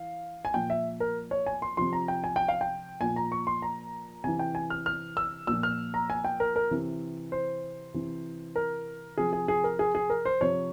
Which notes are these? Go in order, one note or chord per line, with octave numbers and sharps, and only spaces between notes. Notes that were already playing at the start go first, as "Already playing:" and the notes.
Already playing: E3 F5
G#5
A#2 F3 G5
E5
A#4
C#5
G#5
C6
C3 F3 C6
A#5
G5
G#5
G5
F5
G5
A#2 F3 G#5
A#5
C#6
C6
A#5
C3 E3 G#5
G5
G#5
F6
F6
E6
A#2 F3 E6
F6
A#5
G#5
G5
A#4
A#4
C3 E3
C5
C3 E3
A#4
C3 F3 G#4
G#4
G#4
A#4
G#4
G#4
A#4
C5
C3 F3 C#5